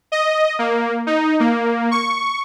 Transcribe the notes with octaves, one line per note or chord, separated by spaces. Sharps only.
D#5
A#3
D#4
A#3
C#6